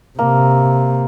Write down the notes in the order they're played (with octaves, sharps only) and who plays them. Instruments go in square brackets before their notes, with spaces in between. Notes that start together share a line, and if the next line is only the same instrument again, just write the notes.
[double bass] C3 [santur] A#3